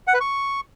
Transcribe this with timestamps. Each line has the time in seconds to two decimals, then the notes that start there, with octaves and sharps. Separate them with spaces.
0.07 F#5
0.14 B4
0.20 C#6